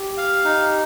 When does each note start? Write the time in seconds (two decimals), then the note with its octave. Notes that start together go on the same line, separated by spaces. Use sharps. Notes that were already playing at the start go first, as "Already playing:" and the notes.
Already playing: G4
0.18 F5
0.45 D#4